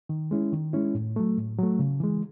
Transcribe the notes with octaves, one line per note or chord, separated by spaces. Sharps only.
D#3
G#3 C#4 E4
D#3
G#3 C#4 E4
A2
F#3 A3
A2
F#3 A3
C#3
E3 G#3